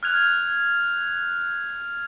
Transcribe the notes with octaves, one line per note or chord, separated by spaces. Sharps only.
F6 F#6 G#6 F7